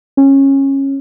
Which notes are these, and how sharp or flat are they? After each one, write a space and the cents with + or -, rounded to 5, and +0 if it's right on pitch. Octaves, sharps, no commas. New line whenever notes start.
C#4 -20